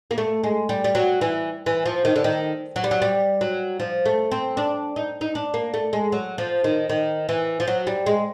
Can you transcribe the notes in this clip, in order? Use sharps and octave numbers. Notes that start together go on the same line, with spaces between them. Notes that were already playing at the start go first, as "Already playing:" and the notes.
A#3
A3
G#3
G3
G3
F#3
E3
E3
F3
D#3
D3
D#3
F#3
G3
F#3
G3
F#3
F3
A3
C4
D4
D#4
D#4
D4
A#3
A3
G#3
F#3
F3
D#3
D#3
E3
F3
F#3
G3
G#3